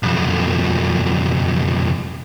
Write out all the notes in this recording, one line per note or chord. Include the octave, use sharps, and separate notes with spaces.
B1 F2